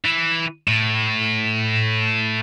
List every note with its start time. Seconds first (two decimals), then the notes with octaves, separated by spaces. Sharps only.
0.05 E3
0.68 A2